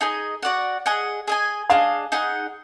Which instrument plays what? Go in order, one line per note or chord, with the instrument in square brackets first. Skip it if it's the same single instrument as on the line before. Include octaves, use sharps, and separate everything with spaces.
[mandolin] D#4 G#4 D#5
F#4 D5 F#5
G#4 D#5 F#5
G#4 D#5 G#5
[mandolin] D4 G#4 D#5 [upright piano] F5
[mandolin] D#4 G#4 D#5 F#5